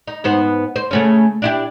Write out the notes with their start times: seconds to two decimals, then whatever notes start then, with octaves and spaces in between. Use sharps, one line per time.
0.07 D#4
0.24 G#2 B3 C5
0.76 C5
0.91 C#3 A3 C#4
1.42 D4 E4 G4